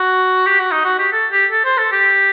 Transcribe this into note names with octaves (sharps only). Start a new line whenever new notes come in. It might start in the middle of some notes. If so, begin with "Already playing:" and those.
Already playing: F#4
G4
F#4
D#4
F#4
G4
A4
G4
A4
C5
A4
G4